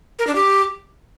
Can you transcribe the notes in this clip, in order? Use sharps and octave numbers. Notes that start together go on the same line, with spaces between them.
A#4
D4
G4